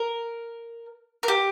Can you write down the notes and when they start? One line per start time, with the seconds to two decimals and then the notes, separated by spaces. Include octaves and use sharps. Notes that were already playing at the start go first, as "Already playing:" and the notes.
Already playing: A#4
1.23 A#4
1.28 G4